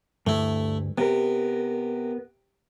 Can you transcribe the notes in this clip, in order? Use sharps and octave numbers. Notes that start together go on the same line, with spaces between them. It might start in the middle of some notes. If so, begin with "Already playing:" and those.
D2 G2 A3 E4
C3 B3 A#4